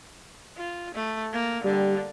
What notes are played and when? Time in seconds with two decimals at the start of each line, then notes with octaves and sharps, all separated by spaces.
0.57 F4
0.95 A3
1.33 A#3
1.64 D3 G3